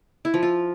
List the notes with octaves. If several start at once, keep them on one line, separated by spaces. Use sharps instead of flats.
E4
F3
F4